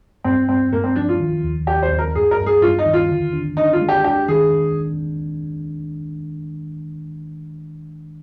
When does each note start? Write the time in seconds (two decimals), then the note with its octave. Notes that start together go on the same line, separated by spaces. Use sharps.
0.24 G2 C4
0.49 G2 C4
0.72 G2 A#3
0.84 C4
0.96 F3 D4
1.09 F4
1.20 D#3
1.43 D#2
1.67 D#2 G4
1.83 C5
1.91 D#2
1.99 A#4
2.15 G2 G#4
2.31 A#4
2.39 G2
2.46 G#4
2.62 G2 F4
2.79 D#4
2.86 D#3
2.93 F4
3.09 D3
3.33 D4
3.57 D4 D#4
3.73 F4
3.81 G#3
3.89 G4
4.04 D4 G4
4.28 D#3 G#4